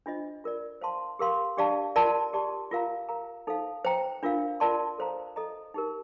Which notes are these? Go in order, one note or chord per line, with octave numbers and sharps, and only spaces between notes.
D4 F4 C5 D#5
F4 A#4 D5
C5 F5 A5 C6
G4 A#4 F5 C6
D4 G4 D5 F5 A5
F4 A#4 D5 A5 C6
G4 D5 A5 C6
F4 A#4 F5 A#5
A#4 F5 A#5
D#4 A4 C5 F5
C5 G5 A#5
D4 F4 A#4 F5
F4 A#4 D5 A5 C6
A4 C5 F5 A#5
A4 D#5 A#5
D#4 G4 A#4